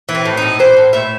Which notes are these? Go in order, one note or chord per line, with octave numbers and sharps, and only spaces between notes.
E3
C4
A2
A2 D#4
E3 C5
A2
A2 E5